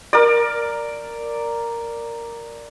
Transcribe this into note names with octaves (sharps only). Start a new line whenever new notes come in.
A#4 D5